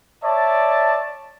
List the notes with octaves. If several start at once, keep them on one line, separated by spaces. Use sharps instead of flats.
C#5 D5 E5 A5